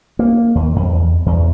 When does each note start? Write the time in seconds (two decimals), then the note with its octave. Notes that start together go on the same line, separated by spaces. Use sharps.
0.19 A#3
0.55 D#2
0.76 F2
0.95 E2
1.26 E2